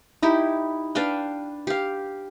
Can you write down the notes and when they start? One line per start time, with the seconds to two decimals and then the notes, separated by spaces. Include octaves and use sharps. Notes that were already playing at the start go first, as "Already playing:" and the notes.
0.23 D#4 E4 G4
0.95 D4 B4 F5 G5
1.67 G4 F5